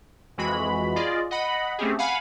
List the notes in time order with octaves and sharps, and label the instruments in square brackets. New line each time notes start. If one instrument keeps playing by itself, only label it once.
[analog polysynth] F2 E3 G#3 F#4 B5
F4 G#4 D5 D#5
D#5 F#5 B5
A3 C4 C#4 G4 G#4
F5 F#5 G#5 B5